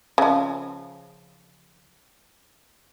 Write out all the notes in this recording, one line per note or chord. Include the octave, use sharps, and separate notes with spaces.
C#3 F3